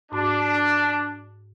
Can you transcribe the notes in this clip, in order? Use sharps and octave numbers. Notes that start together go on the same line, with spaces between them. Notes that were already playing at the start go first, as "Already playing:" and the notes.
G#2 D4 F#4